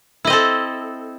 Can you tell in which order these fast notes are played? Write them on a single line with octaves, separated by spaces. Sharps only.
E4 D#5 C4 A4